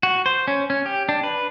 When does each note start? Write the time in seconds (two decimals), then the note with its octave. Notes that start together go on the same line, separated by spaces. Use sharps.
0.03 F#4
0.26 C5
0.48 C#4
0.70 C#4
0.86 G4
1.09 D4
1.24 B4